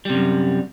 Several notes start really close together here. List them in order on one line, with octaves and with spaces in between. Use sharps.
G3 C3 F#2